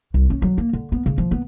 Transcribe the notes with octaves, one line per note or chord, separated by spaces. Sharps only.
C2
C#4
F#3
A#3
D3
B3
C#3
F3
B3